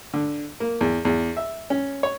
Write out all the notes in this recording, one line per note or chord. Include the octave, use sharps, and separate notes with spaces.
D3
A#3
E2
E2
E5
C#4
C#5